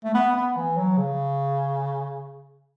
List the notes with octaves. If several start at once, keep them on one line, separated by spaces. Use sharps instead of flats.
A3
B3
B3
E3
F#3
C#3